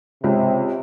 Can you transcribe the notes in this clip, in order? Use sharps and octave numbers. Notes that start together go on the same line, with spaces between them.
C#2 C3